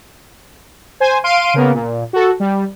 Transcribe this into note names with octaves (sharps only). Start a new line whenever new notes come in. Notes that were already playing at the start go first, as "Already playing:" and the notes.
C5 G#5
F5 C6 D7 D#7
C#3 A#3 B3
A#2
F#4 A4
G3